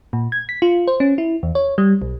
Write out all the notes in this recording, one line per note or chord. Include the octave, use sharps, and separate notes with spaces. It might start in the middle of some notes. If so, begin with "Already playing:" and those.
A#2
G#6
B6
F4
C5
C#4
E4
E2
C#5
G3
B1